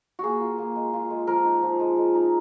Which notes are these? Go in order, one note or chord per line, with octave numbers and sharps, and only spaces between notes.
A#3 F#4 G#4
F4
A#3
G#3
F4
G#3
F3 A#4
D#4
F3
G#3
G#3
D#4